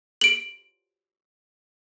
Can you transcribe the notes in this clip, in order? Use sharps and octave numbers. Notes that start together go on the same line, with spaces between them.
D7 F#7